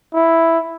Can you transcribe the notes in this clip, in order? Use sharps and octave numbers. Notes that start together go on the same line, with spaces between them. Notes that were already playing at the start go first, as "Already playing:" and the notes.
E4